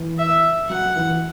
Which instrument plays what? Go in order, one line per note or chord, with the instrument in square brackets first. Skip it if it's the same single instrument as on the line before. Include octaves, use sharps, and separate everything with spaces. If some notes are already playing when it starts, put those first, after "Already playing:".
Already playing: [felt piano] E3
[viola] E5
[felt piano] F#3 [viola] F#5
[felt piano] E3